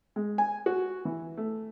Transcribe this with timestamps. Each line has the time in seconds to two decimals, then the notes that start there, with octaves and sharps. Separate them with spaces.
0.16 G#3
0.38 G#5
0.66 F#4
1.05 E3
1.37 A3